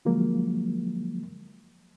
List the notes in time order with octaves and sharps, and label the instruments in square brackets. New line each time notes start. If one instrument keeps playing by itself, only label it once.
[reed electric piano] D3 F3 F#3 G#3 A#3